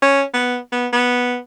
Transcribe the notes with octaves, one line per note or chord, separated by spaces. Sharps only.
C#4
B3
B3
B3